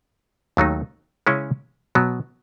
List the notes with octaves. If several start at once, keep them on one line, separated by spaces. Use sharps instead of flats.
D#2 D#3 F#3 A3 D#4
C#3 G#3 C#4 E4
B2 F#3 B3